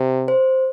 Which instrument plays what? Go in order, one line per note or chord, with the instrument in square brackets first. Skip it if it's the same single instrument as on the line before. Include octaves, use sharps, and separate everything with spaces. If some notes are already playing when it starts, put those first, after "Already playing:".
Already playing: [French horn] C3
[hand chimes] C5